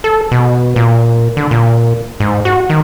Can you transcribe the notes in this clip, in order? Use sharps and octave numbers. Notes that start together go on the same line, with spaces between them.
A4
B2
A#2
D3
A#2
G#2
F#4
D#3